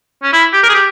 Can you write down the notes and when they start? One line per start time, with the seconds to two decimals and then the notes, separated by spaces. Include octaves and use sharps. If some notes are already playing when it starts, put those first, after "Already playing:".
0.23 C#4
0.33 E4
0.53 G4
0.63 A#4
0.69 G#4
0.74 G4